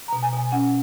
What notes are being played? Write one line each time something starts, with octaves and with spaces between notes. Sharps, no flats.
B2 A#5
G#5
B2 G#5
C#4 F#5